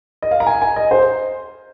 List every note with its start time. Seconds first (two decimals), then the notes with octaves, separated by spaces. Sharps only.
0.22 D#5
0.31 F5
0.40 A#5
0.47 G#5
0.62 G#5
0.76 D#5
0.91 C5